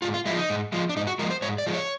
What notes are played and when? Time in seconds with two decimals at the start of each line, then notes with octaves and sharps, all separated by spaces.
0.02 G#2 F4
0.14 F4
0.26 F3 G#3 E4
0.37 D#4
0.50 G#2
0.72 F3 G#3
0.89 D4
0.96 G#2 D#4
1.07 F#4
1.19 F3 G#3 A#4
1.31 C5
1.42 G#2 C#5
1.58 D5
1.66 F3 G#3
1.74 C#5